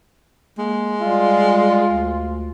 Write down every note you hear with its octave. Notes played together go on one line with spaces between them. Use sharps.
G#3 A#3
G3 F4
D2